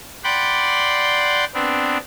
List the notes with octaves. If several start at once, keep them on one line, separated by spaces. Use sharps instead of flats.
D5 F#5 G5 B5 C6
B3 C4 D4